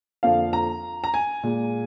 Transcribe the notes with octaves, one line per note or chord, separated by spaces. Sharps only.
F2 D3 F3 A#3 F5
A#5
A#5
G#5
A#2 G#3